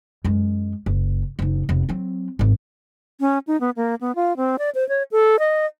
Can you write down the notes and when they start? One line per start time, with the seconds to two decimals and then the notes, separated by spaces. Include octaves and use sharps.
0.24 F#2 G#3
0.86 F#1
1.39 F#1 D#4
1.69 F1 B3
1.89 F#3 C4
2.39 G#1 F#2
3.20 C#4
3.47 D#4
3.61 B3
3.76 A#3
4.01 B3
4.15 F4
4.37 C4
4.59 D5
4.75 C5
4.89 C#5
5.12 A4
5.39 D#5